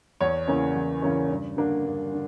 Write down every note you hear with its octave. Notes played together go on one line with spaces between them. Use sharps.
E2 C#5
C#3 E3 A#3 C#4
E2
C#3 E3 A#3 C#4
G2
D3 A#3 D4
G2
D3